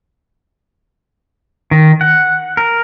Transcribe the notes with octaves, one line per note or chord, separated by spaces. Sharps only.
D#3
F#5
A#4